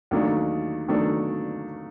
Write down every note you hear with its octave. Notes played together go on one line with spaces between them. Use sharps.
D#2 D#3 F#3 A3 D4
D#3 F#3 A3 D4